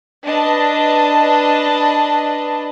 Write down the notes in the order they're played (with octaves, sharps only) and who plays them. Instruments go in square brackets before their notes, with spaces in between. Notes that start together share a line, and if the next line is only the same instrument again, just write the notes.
[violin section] D4 B4 D#5 A5